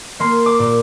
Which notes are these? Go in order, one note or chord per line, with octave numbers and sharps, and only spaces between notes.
A#3 C6
D6
A#2